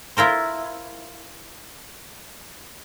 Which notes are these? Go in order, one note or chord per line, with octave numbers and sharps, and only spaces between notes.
E4 F4 A#4 C5